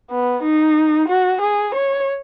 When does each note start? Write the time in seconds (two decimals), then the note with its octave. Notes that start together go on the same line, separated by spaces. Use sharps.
0.11 B3
0.43 D#4
1.08 F#4
1.41 G#4
1.75 C#5